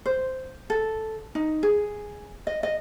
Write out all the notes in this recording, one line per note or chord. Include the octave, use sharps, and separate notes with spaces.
C5
A4
D#4
G#4
D#5
D#5